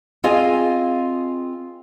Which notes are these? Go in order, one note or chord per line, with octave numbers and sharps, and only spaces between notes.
C4 F4 G#4 D#5 F5 G#5